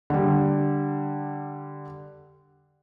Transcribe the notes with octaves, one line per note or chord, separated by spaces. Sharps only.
D3 G3